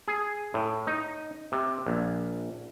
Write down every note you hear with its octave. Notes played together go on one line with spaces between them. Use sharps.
G#4
A2
D#4
C3
A#1